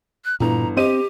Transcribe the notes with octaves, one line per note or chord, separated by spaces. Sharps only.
F#6
G1 A#2 E3 A#5
C4 G4 C5 D#5 D#7